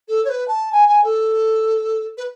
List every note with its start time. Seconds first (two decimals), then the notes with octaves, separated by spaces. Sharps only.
0.08 A4
0.24 C#5
0.29 B4
0.48 A5
0.72 G#5
0.88 G#5
1.04 A4
2.17 B4